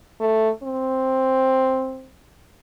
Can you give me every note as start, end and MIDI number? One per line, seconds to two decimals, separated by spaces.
0.20 0.50 57
0.63 2.09 60